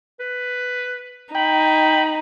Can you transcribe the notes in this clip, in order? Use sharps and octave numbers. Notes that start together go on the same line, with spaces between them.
B4
D#4 G5 B5